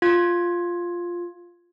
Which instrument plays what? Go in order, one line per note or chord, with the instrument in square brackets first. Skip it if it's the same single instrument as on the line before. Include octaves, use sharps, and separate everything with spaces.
[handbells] F4 G#6